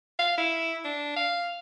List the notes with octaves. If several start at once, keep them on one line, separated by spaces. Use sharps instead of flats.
F5
E4
D4
F5